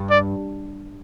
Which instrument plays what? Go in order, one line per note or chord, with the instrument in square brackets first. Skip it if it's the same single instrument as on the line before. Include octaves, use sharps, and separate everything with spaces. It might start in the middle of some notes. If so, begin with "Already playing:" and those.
Already playing: [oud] G2
[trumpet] D5